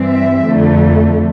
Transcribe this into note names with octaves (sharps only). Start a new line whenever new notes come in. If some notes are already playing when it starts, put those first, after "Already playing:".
Already playing: G2 E3 G3 C4
E5
F2 D3 A3